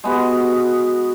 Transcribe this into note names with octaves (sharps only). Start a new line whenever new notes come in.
G#3 B3 F#4